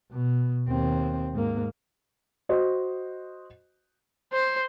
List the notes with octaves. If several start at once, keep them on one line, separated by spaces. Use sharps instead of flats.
B2
D#2 C4
G#2 A#3
F#4 C5 D#5
C5